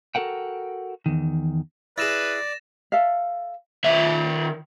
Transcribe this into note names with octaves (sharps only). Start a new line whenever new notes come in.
F#4 A4 A#4 F#5 G5
E2 D#3
E4 G#4 B4 D5 A6 A#6 E7
A4 E5 F5
D#3 E5